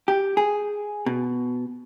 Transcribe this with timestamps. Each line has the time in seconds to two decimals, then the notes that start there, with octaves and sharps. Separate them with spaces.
0.08 G4
0.37 G#4
1.06 B2